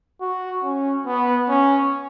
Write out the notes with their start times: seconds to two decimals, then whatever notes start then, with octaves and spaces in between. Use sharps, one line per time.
0.21 F#4
0.63 C#4
1.06 B3
1.49 C#4